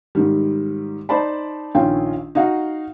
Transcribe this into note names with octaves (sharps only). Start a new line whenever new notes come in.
G#2 D#3 G3
D#4 C5 D5 A5 B5
A#1 D#3 C#4 F4 G5
D#4 F#4 F5 F#5